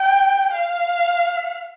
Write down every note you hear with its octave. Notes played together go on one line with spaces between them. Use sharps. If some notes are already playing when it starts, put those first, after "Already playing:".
Already playing: G5
F5